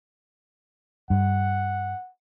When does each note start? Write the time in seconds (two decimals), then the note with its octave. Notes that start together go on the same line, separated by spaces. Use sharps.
1.10 G2 F#5